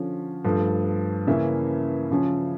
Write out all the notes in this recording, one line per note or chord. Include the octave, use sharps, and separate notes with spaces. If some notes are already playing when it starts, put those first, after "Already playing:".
Already playing: D3 F3 C#4
G2 F3 A3
C#3 E3 A#3 C#4 E5
C#3 F3 C#4